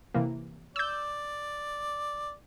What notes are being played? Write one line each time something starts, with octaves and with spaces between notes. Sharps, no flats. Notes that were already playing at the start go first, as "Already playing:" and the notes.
C3 E3 A#3
D5 E6 G6